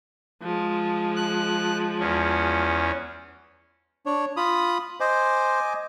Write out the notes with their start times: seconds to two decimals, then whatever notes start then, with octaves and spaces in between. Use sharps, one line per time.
0.43 F3 G#3
1.16 F#6
1.99 E2 C#4
4.06 D4 C#5
4.37 F4 B5 D#6
5.00 C5 D#5 G#5 D6